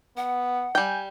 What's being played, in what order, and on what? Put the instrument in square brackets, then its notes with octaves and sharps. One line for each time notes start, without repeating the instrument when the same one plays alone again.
[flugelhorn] B3 [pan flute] F#5
[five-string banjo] G3 G5 [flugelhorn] G#5